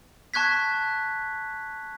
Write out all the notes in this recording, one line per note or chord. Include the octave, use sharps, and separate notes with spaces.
A5 C#6 F#6 G#6 B6